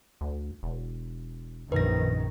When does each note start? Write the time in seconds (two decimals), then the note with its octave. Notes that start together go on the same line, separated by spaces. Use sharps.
0.21 D2
0.63 E1
1.72 A#1 F#2 D#3 B4 A#6